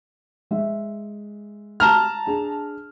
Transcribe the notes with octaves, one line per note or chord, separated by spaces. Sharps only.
G#3 E5
A5 A#5 F6
D4 G#4